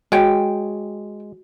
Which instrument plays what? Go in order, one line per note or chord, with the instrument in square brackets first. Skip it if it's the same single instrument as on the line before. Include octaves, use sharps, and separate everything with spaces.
[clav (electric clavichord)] G#3 [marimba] F#4 [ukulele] C#5 G5